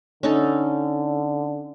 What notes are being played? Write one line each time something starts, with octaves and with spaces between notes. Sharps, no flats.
D3 C#4 D#4 A4